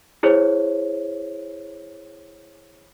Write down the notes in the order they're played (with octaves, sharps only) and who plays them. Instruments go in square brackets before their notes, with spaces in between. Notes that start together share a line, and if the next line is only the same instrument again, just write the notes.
[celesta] E4 G#4 C5 C#5